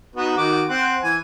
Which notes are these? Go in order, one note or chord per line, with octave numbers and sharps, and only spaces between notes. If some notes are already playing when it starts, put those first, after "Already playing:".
B3 D#4 F#4
D#3 F#4 D6
C4 C5 F#5
E3 G#5